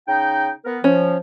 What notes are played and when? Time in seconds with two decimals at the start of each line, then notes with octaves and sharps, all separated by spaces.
0.07 C#3 D#4 G5
0.64 B3 A#4
0.84 F3 C#4